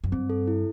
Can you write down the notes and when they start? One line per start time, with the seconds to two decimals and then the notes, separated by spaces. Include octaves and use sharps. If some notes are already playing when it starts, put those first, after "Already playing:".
0.04 F#2
0.12 G2 C4
0.30 A4
0.47 E4